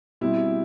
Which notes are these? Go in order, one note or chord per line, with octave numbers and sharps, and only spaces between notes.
B2 G3 C4 E4